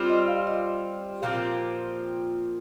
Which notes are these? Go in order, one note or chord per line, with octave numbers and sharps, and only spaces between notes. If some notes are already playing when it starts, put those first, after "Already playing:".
Already playing: G3 C4 F4
D#5
F5
D#5
A#2 F3 C4 G4 F5